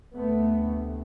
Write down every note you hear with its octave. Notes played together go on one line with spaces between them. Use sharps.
D2 C3 A3 B3